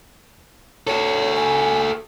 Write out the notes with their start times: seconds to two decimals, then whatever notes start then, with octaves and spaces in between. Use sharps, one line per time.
0.87 F#4 A4 C#5
1.36 G#5